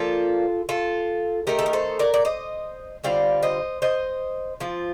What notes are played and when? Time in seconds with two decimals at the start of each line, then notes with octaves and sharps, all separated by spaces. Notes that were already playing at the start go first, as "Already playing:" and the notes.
Already playing: F3 A#3 D4 F4 A4
0.69 F4 A4
1.47 D#3 A3 D#4 G4 A#4
1.59 A4
1.66 A#4
1.73 A4 C5
1.99 A#4 D5
2.14 D5
2.25 C5 D#5
3.04 D3 G3 C4 F4 D5 F5
3.43 C5 D#5
3.82 C5 D#5
4.60 F3 C4 F4